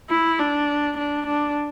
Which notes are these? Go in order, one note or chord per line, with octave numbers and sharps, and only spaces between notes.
E4
D4
D4
D4